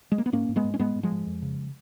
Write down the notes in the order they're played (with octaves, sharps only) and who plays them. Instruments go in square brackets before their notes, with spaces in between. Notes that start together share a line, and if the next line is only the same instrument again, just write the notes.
[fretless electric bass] G#3
A#3
B3
G#2 A#3 C#4
G#2
G#3 B3
G#2
C#4
G#2 G#3 B3
G#2
F3 G#3
G#2
F2
C#3